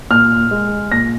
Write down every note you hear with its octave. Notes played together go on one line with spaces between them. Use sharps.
A#2 F6
G#3
A#2 A#6